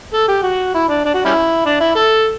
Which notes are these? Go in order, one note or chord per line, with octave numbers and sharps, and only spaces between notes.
A4
G4
F#4
E4
D4
D4
F#4
G3 C#4 E4
D4
E4
A4